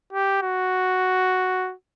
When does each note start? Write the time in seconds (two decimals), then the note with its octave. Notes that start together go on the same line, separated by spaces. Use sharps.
0.13 G4
0.42 F#4